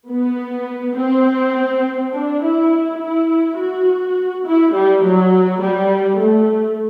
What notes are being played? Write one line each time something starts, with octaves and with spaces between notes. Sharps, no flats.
B3
C4
D4
E4
E4
F#4
E4
G3
F#3
G3
A3